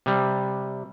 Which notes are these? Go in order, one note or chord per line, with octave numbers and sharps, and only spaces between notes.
C3 G3